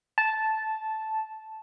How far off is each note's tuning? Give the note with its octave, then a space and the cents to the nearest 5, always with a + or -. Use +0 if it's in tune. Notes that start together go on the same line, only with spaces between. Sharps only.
A5 -10